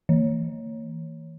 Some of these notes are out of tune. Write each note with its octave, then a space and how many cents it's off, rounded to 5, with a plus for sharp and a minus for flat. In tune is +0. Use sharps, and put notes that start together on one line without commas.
E3 -30